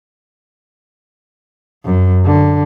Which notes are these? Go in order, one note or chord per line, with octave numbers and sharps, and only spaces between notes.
F#2
D3